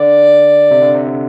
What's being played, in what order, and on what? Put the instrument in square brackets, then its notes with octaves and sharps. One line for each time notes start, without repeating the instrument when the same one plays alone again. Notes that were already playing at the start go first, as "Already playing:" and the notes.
Already playing: [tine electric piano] D3 [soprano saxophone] D5
[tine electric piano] C3
D3
C3
D3